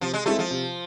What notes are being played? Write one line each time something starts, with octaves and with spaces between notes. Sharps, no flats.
C3 F3
G#3
G#3 A3 C4 E4 A4
F3
C3